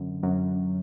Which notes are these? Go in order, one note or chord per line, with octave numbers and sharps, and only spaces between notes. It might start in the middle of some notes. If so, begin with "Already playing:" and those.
Already playing: F#2 D3
F#2